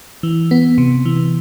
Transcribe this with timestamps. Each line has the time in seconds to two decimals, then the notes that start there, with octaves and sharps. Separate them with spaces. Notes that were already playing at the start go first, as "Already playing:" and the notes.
0.23 E3
0.51 B3
0.78 C3
1.06 E3